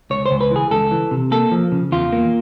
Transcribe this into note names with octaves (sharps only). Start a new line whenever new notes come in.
C#2 C#5
C5
C#2
B4
E3 G#4
C#2 A4
E3
C3
A#3 A4
F3
C#3
E2 F4
A#3